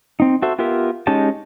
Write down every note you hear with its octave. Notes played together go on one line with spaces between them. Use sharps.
C4 D#4
F#4 A4 C5 E5
B3 F4 G4 A#4 E5
G#3 C#4 D#4 G4 A5